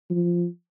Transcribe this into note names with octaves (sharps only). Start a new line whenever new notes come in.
F3